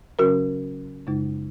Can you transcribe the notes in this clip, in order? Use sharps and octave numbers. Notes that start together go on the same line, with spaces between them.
C#3 F#3 C#4 F#4 A#4
F#2 C#3 G#3 D#4